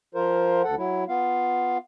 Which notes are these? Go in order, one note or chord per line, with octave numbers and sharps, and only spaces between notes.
F3 F4 A#4 C5
D2 A4 F#5
F#3 E4
B3 F4 F5